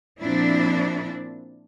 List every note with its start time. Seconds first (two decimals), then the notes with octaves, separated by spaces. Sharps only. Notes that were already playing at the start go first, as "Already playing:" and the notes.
0.20 A#2 F3 C4 D4 E4